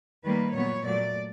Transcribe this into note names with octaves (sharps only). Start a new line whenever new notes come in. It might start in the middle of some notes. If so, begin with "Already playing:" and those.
D#3 G3 A#3 B4
A#2 F#3 B3 C#5
A#2 F#3 A3 D5